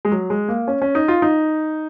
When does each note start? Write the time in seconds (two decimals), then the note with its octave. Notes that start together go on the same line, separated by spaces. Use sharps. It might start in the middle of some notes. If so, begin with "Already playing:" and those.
0.05 G#3
0.12 F#3
0.30 G#3
0.48 A#3
0.68 C#4
0.82 C#4
0.95 D#4
1.08 F4
1.22 D#4